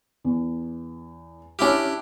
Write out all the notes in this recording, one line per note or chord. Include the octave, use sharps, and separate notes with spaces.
E2
C#4 D4 E4 G4 F6